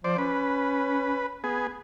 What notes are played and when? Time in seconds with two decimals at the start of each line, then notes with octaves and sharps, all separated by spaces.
0.04 F3 C5 D5
0.18 C#4 B4
1.44 B3 G#4